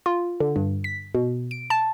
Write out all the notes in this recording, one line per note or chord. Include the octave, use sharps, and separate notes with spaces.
F4
D3
G2
B6
B2
D7
A5